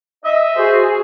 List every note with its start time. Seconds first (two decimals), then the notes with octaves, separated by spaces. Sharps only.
0.25 D#5 E5
0.56 F#4 G#4 C5